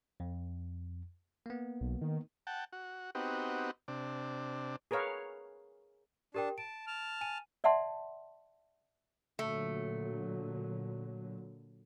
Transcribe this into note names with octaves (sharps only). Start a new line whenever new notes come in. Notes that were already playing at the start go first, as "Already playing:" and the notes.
F2
A#3 B3
B1
D#3
F#5 G5 A5
F#4
B3 C4 D#4 F#4 G4
C3 D4
G#4 A#4 B4 C#5 F5
D4 G4 A#4 G5 A5
A5 D7
A5 F6
G#5 D#7
D5 E5 F#5 A5 C6
A#2 D3 F#3 A3